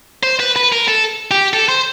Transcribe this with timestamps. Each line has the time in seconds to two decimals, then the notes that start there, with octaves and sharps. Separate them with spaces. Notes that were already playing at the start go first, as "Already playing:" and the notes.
0.23 C5
0.40 B4
0.56 B4
0.72 A#4
0.88 A4
1.31 G4
1.53 A4
1.69 C5